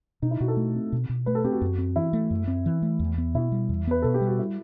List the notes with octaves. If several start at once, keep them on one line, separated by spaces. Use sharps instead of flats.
B2 D#4
E4
B2 F#4
A4
A3
C4
B2
B2
A3 B4
A4
C4 G4
F#4
F#2
C4
E3 E4
A3
F#2
C4
E3
A3
E2
B3
B2 E4
G3
E2
B3 B4
B2 A4
G4
G3
F#4
E4